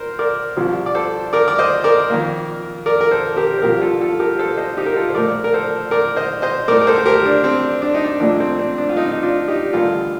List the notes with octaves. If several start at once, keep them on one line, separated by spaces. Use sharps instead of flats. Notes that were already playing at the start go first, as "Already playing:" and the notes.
Already playing: A#4 C5
A#4 D5
C2 C3 F3
D5
A4 C5
A#4 D5
D5
C5 D#5
A#4 D5
F2 D#3 A#3
A#4 D5
A#4
A4 C5
G4 A#4
C5
C2 C3 F3 A#3 G4 A#4
F4 A4
F4 A4
G4 A#4
A4 C5
C5 D#5
D#4 G4
A#4
F4 A4
C5
A#1 A#2 A3 A#4 D5
A#4
A4 C5
A#4 D5
C5 D#5
C5 D#5
A2 A3 A#4 D5
A#4
A4 C5
C5
G4 A#4
D4
C4
D4
D#4
D4
A#1 A#2 A3 D4
C4
C4
D4
F4
C4 D#4
D#4
D4 F4
D#4 G4
A1 G2 D3 G3 A#3 F4 A4